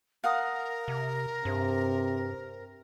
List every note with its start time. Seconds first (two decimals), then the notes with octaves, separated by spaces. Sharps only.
0.24 A#4 F5 F#5 D#6
0.88 C3
1.45 G2 C3